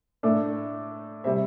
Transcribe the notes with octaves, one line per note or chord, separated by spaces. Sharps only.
A2 A3 D4 A4 D5
C3 G3 C5 E5